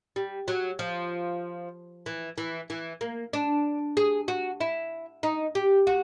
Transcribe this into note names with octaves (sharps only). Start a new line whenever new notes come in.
G3
F#3
F3
E3
E3
E3
A#3
D4
G#4
F#4
E4
D#4
G4
F#4